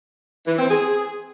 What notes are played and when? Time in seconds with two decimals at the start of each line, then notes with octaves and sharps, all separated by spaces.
0.47 E3
0.59 C4
0.71 G#4